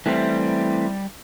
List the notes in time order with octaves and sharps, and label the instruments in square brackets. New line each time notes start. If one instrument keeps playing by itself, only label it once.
[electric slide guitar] E3 A3 C4 [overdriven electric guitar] G3